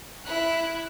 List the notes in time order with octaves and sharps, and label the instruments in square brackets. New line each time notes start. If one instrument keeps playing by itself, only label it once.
[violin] E4 F#6